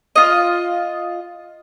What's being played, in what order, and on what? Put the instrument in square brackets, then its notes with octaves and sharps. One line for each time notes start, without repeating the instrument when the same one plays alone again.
[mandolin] F4 D#5